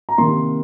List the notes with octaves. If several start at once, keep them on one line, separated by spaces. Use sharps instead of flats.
A#5
C3 D#3 A#3 C6